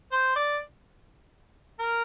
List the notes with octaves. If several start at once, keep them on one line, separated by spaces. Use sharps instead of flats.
C5
D5
A#4